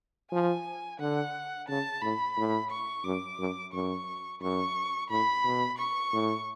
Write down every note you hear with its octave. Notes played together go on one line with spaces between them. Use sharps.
F3 G#5
D3 F#5
C#3 A5
A2 B5
A2
C#6
F#2 D6
F#2
F#2 C#6
F#2 C#6
A2 B5
B2
C#6
A2